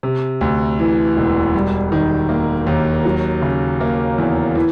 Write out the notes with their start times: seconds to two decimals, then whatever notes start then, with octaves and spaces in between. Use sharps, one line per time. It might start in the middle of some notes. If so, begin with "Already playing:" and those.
0.03 C3
0.41 D2
0.79 E3
1.17 E1
1.54 G3
1.92 D#3
2.29 A#3
2.67 D#2
3.05 F#3
3.42 C#3
3.80 A#3
4.18 E2
4.55 E3